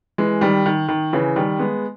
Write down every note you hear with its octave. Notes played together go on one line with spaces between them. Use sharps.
E3 G#3
D#3 G3
D#3
D#3
C#3 E3
D#3 G3
G#3 B3